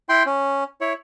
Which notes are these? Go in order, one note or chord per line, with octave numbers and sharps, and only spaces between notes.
E4 G5 C6
C#4
E4 C#5